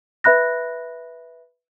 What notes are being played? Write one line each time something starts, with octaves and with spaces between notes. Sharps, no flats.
B4 E5 B5 F#6 A#6